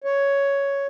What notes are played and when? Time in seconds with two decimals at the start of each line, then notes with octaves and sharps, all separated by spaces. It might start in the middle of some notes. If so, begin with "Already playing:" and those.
0.04 C#5